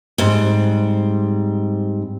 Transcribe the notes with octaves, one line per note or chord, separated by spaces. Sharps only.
G#2 G3 C4